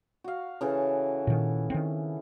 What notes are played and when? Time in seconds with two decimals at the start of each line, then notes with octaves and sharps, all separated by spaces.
0.24 F#4 F5
0.61 C#3 E3 A4
1.27 A#2 D#3
1.70 D#3 C4